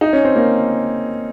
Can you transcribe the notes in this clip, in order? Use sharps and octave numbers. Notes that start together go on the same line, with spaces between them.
D#4
C#4
C4
A#3